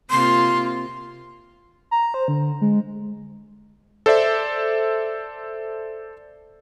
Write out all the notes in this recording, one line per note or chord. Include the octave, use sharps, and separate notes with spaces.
C3 A#3 F4 C6
A#5
C5
D3
G#3
A4 C5 D5 E5